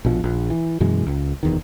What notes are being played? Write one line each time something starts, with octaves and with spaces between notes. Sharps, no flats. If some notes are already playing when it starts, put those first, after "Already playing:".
A#1 B2 F3
A#1
E3
F#2 B2 E3 G#3
C#2
F1 E2 D#3